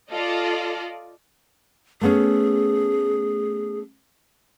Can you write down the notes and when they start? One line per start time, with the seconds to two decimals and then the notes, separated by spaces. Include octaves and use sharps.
0.11 F4 A4 D5 D#5
2.01 A3 B3 C#4 G#4